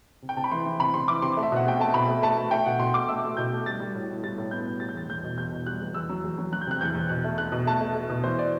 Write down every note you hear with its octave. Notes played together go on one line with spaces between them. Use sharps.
C3
G5
C3 A5
B5
E3 C6
E3
C3 B5
C3 C6
E3 D6
C3 C6
A3
E5
B2 F#5
A3 G5
A3 A5
B2 B5
A3
A3 A5
A3
A3 G5
B2 F#5
B2 C6
A3 D6
A3 E6
A3
B2 G6
A3
G3 A6
G3
A2
A2
G3 A6
A2
B3 G6
A2
G3 A6
G6
E2 A6
E2 G6
B2
E2 G6
B2
G3 F#6
E2
E2 E6
F#3
E2
F#3
F#3 F#6
G6
C3 F#6
E2 G6
E2
B2 F#6
A3
A3 F#6
B2
A3 A5
A3
A3
B2
E3 C5
D5